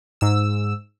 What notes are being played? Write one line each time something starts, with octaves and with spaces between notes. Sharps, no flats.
G#2 E6